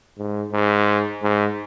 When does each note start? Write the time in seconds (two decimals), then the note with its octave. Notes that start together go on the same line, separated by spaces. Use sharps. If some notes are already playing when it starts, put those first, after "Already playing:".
0.18 G#2
0.53 G#2
1.23 G#2